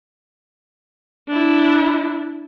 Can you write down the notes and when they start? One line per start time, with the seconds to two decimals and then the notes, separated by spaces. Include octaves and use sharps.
1.28 D4 E4